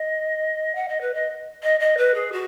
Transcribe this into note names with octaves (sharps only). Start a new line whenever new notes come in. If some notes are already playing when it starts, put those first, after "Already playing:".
Already playing: D#5
F#5
D#5
B4
D#5
D#5
D#5
B4
G#4
F#4